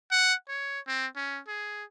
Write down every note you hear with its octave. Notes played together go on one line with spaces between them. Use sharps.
F#5
C#5
C4
C#4
G#4